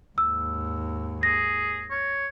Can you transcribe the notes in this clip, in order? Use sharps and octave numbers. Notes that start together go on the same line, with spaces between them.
D#2 G#2 E6
G#4 A#6
C#5